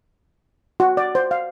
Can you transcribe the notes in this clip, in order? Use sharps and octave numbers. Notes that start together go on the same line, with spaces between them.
F#4
D5
C5
F5